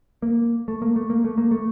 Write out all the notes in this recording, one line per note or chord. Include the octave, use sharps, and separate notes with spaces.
A#3
A3
A#3
A3
A#3
A3
A#3
A3